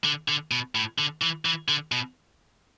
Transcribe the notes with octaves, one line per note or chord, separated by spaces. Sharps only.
D3
D3
B2
A2
D3
E3
E3
D3
B2